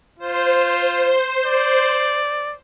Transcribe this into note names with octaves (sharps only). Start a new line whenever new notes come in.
F4 C5
D5